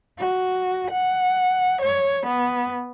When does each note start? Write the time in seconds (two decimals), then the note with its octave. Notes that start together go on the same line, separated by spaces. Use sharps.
0.19 F#4
0.92 F#5
1.83 C#5
2.27 B3